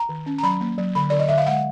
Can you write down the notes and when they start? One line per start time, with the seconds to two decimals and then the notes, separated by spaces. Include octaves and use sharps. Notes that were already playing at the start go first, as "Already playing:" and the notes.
Already playing: A#5
0.09 D#3
0.26 C#4
0.38 A#5
0.43 F#3 B5
0.61 A#3
0.78 F#3
0.95 D3 B5
1.10 D3 D5
1.19 D#5
1.29 D3 E5
1.38 F5
1.46 G#3 F#5